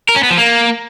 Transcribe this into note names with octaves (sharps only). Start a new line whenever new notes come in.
A#4
C#4
B3
F3
A#3